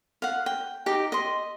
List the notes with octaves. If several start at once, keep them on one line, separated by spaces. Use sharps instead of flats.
F5 F#5
G5
D#4 G4 D#5
D#5 C6